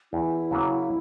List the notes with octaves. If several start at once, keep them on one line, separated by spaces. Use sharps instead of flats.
E2 E4
C#3 F#3 A#3